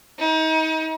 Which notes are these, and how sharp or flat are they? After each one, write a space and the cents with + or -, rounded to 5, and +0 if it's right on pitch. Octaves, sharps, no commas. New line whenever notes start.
D#4 +35